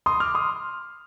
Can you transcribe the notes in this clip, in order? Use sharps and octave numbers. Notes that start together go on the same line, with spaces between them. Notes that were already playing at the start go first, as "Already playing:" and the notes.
C6 D#6
D6 F6
C6 D#6